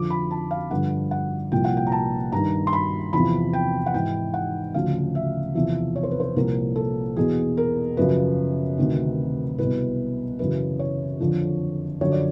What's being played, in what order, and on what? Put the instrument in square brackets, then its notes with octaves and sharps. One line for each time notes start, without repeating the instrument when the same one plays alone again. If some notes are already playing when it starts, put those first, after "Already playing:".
Already playing: [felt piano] F2 D3 F3 D6
B5
A5
F5
G2 D3 F3 F#5
F#5
C2 A#2 F3 G5
F#5
G5
A#5
A5
G2 D#3 A#5
C6
B5
E2 C3 F3 B5
G5
F#5
G#2 E3 G5
F#5
D2 C#3 F3 F5
E5
E2 C3 F3 E5
C#5
C5
B4
C5
C2 A#2 F3 A#4
A4
E2 B2 G#4
A#4
F#2 C#3 F3 B4
D2 C3 D#3
C2 B2 B4
F#2 C#3 E3 B4
C#5
F2 D3 F3
F#2 D3 F3 C#5
D5